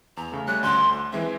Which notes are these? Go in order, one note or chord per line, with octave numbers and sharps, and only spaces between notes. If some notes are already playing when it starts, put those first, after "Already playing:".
E2 A#5
C#3 A3
G3 A3 C#4 F#6
D2 D3 C6 G6
E3 G#3 C4 E5